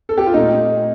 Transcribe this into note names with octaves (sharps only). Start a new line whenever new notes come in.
A4
G4
F4
A#2 A3 C4 D#4